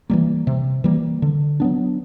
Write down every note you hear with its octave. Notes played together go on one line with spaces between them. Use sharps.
E3 G3 A#3
C3
E3 G3 A#3
D3
F#3 B3 D4